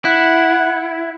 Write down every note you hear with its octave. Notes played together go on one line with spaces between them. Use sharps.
E4 F#5